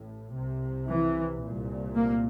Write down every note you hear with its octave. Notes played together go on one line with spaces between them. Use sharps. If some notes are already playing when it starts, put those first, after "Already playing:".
Already playing: A1 A2
C2 C3
E3
C2 A#2
A#3